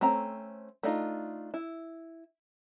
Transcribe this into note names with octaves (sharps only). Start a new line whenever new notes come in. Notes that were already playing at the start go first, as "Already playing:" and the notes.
A3 C4 C#4 A#5
A3 D4 D#4 F4
E4